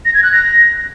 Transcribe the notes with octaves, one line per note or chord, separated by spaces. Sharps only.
A#6
G#6
F#6
A#6